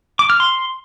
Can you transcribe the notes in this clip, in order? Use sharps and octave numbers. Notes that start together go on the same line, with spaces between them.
D6
F6
C6